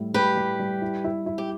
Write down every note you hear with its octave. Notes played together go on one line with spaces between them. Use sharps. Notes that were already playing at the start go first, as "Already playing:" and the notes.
Already playing: A2 G3 E4
G3 G4 B4
G3
G3
E4
E4
E4
G4